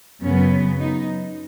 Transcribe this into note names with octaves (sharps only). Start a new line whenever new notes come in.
F#2 C#3 F#3 B3 C#4
D#4